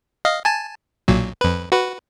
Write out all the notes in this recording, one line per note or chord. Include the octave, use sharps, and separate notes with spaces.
D#5 F5
G#5 A5
B1 A#2 F#3
F2 B4
F#4 B4